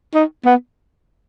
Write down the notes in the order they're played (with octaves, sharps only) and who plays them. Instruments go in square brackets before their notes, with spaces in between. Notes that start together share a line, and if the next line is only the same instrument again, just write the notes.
[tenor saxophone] D#4
B3